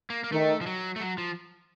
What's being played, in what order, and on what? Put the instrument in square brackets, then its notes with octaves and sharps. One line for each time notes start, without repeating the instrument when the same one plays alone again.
[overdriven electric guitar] A#3
A#3
[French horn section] D#3 [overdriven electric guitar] A3
[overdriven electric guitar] F3
F#3
A3
F#3
F3